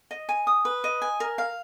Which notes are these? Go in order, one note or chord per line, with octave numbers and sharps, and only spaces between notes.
D#5
G#5
D#6
B4
D#5
G#5
A#4
F5